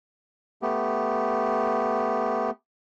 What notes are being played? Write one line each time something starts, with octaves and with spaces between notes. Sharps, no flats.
A3 B3 G4